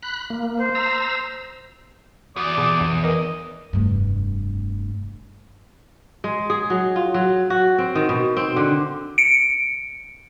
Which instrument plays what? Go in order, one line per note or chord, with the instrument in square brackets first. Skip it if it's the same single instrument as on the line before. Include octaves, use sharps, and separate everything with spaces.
[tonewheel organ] B5 F#6
A#3
[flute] C5
[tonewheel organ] A#5 E6
[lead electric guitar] E2 [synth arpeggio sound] F#4 [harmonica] D5 D#6
[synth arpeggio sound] B2 G#4
B1 F2
[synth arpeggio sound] D#3 A#4 B4 [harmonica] D#5
[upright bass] F1 G2
[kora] G#3
G#4
F#3
F4
F#3
F#4
C4
D#3
B2
C4
D3
[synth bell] C#7 D7